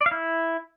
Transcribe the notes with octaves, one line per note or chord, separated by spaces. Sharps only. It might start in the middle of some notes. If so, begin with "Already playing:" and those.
D5
F5
E4